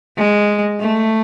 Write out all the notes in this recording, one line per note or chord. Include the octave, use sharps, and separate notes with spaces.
G#3
A3